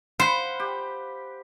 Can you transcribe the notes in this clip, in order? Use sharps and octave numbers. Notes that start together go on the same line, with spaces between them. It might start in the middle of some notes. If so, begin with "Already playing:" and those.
C5 F5 F#5 B5
G4